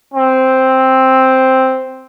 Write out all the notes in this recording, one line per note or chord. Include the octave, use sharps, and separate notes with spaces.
C4